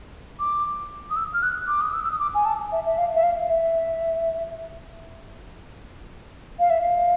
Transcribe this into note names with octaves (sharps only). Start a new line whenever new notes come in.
D6
D#6
E6
F6
F#6
D6
D#6
E6
E6
D#6
D6
G#5
A5
E5
E5
F5
E5
F5
E5
F5
E5
F5